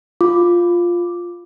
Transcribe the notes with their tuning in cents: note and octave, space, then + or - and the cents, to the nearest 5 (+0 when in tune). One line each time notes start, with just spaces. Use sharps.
F4 +0 D6 +0